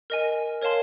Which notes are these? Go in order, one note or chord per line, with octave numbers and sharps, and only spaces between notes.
A#4 D#5 G#5
A#4 C#5 F5 A5 C6